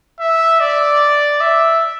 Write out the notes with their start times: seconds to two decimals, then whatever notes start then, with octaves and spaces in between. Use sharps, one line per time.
0.20 E5
0.60 D5
1.41 E5